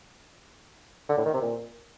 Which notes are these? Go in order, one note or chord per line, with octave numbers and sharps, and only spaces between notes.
D3
A2
D#3
C3
A#2